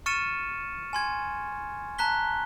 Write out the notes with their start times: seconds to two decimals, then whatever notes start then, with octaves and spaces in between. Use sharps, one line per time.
0.06 C#6 F6 A6 C#7 D#7 E7
0.93 G#5 C6 G#6
1.98 A5 A#5 F#6 B6 G7